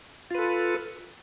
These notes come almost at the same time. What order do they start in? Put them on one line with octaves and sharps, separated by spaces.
F4 B4 A4